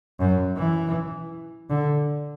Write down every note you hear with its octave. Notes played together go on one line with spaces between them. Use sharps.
F#2
E3
D3